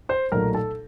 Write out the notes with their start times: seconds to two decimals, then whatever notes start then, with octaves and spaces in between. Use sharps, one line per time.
0.09 C5 C6
0.32 B1 A#2 F#3 A3 A#4 A#5
0.55 A4 A5